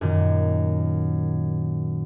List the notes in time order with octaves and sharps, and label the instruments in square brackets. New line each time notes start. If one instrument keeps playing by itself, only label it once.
[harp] F#2 A#2 D#3